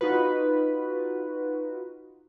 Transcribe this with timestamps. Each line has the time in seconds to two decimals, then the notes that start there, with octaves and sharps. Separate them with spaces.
0.01 D#4 F4 F#4 B4